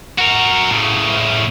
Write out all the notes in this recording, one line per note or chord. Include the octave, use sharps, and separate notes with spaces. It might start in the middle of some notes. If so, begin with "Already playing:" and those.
F#4 A#4
A2 C#3